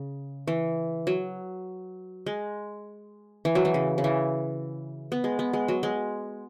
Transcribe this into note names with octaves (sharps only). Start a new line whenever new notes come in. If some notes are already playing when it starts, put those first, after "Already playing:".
Already playing: C#3
E3
F#3
G#3
E3
F#3
E3
C#3
C#3
E3
B3
G#3
B3
G#3
F#3
G#3